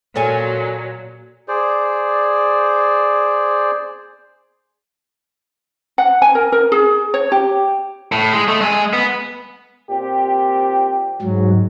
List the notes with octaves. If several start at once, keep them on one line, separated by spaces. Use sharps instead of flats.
A#2 F#3 A4 C#5 G#5
G#4 C5 D5
F#5
G#5
A#4
A#4
G#4
C#5
G4
A2
G#3
A3
G#3 G#5
B3
A#2 C4 G4
G#2 F#3